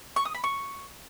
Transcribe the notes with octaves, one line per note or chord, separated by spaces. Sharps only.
C#6
D#6
B5
C#6